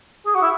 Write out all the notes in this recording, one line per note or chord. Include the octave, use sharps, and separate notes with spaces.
G#4
F#4
E4